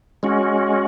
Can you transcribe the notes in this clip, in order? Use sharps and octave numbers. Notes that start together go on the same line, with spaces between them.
G#3 C#4 F#4